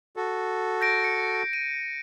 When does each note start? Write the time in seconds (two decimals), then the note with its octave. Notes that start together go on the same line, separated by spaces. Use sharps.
0.16 F#4 A4
0.81 G6 A#6 D7
1.04 C#7
1.53 D#7